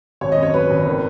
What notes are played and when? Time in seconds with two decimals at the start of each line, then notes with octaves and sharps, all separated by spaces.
0.21 G#1 C#5
0.32 D#5
0.37 F#2
0.43 C#5
0.54 F#2 B4
0.70 G#1
0.86 D#3